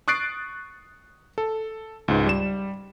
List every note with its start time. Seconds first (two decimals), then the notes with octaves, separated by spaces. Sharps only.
0.08 C#6 D#6 F#6 A6 C7 D7
1.38 A4
2.08 C#2 G#2
2.26 G3 E7